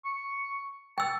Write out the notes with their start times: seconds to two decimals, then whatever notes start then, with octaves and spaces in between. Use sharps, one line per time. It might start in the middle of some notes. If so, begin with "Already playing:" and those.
0.05 C#6
0.98 G5 A5 E6